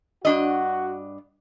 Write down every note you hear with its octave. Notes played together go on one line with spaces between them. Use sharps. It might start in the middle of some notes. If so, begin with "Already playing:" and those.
G2 D4 F#4 D#5